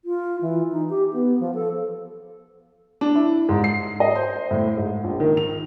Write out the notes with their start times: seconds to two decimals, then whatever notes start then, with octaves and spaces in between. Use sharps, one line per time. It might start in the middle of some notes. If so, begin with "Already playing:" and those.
0.05 F4
0.41 E3
0.72 D#4
0.90 G4
1.13 B3
1.40 F3
1.55 A4
3.01 D4
3.15 E4
3.49 G#2
3.64 C7
4.00 D#5
4.16 C5
4.51 A2
4.77 G#2
5.04 A#1
5.20 D#3
5.37 F7